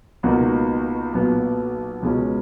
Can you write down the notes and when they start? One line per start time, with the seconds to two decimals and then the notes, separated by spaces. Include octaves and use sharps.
0.23 C#2 B2 A#3 D#4 F#4
1.13 B1 A#2 F#3 B3
2.02 C#2 B2 G#3 C#4